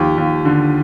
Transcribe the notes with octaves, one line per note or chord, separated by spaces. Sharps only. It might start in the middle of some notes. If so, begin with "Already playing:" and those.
Already playing: D#2 F3 G4
D#2
D3